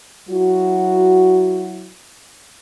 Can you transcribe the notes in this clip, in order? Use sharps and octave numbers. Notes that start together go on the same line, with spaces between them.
F#3 E4 F#4